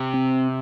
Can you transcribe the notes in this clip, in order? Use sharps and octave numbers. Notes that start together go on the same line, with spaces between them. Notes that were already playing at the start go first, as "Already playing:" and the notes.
Already playing: C3
C4